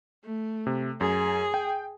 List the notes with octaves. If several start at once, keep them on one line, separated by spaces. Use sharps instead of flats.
A3
C3
F#2 G#4
G5